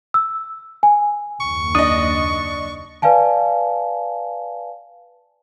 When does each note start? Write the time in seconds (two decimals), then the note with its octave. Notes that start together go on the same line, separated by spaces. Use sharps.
0.14 E6
0.83 G#5
1.41 F#1 D#2 C#6
1.75 D4 D#5 D#6
3.02 B4 D5 F5 G#5 A5